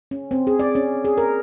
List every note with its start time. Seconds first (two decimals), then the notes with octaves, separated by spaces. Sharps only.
0.11 C#4
0.31 C4
0.47 G#4
0.59 D5
0.75 C#4
1.05 G#4
1.17 A#4